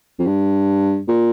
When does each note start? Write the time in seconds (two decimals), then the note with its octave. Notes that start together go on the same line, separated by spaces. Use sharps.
0.19 F2
0.27 G2
1.08 A#2